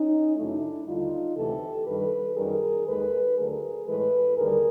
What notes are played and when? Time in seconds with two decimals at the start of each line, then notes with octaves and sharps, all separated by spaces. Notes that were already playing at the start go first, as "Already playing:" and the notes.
Already playing: C#4 D#4
0.37 F#2 C#3 F#3 A3 D4 E4
0.86 D#2 D3 G3 D#4 F4
1.36 D2 C3 E3 A3 G4 A4
1.86 G2 D#3 G3 A4 B4
2.36 F#2 D#3 G3 G#4 A#4
2.87 D#2 D#3 G#3 A4 B4
3.37 D2 D3 F#3 A3 G#4 A#4
3.86 A2 E3 G#3 A4 B4
4.37 D#2 D3 G3 G#4 A#4